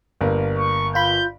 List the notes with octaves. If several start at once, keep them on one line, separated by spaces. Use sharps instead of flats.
G1 A#3
C#6
F4 B5 G6